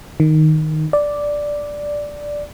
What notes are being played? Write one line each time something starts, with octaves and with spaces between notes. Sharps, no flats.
D#3
D5